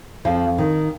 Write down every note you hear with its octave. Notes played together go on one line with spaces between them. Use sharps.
F2 F3
D#3